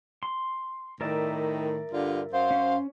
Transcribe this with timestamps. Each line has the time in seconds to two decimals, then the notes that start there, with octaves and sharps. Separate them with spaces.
0.23 C6
1.01 A2 D#3 A#4 D5 E5
1.92 G2 D3 F4
2.33 F#2 C5 F5
2.51 C#4